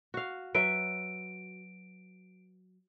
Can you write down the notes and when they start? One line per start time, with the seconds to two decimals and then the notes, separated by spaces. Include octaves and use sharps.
0.14 F#4 F5
0.55 F#3 B4 E5 D7